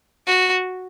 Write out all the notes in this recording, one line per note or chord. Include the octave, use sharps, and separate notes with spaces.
F#4